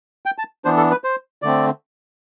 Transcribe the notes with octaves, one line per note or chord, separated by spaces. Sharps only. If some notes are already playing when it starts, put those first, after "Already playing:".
G5
A5
E3 B3 D4 C5
A4
B4
C5
D3 A3 C4 D5